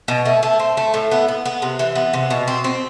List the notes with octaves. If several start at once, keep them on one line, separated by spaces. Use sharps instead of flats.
B2
A3
A3
C4
A3
A2
B3
B3
B3
C3
E3
B3
C3
B2
C4
C4